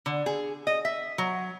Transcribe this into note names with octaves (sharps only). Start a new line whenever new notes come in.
D3
G#4
D#5
E5
F#3